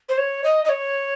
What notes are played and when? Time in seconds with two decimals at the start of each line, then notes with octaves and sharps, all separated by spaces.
0.09 C5
0.18 C#5
0.44 D#5
0.65 D#5
0.69 C#5